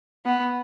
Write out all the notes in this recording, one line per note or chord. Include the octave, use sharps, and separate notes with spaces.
B3